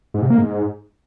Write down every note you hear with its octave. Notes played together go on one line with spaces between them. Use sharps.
G#2
C3
A#3
G#2